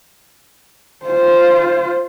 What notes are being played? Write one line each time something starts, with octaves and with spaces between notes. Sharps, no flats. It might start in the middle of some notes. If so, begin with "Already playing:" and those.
F4 C5